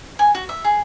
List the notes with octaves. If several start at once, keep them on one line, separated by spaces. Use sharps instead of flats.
G#5
F#4
E5
G#4